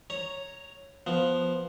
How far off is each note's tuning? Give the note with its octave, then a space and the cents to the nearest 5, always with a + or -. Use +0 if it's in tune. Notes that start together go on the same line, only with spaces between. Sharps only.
C#5 +0 A#5 +0
F3 +0 B3 +0